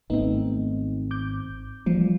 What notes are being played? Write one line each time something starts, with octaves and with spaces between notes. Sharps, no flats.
G#1 A3 B3 C4 D#4
D6 G6
E3 F3 G3 A#3